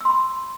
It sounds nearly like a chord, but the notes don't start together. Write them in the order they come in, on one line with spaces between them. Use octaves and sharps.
E6 C6 B5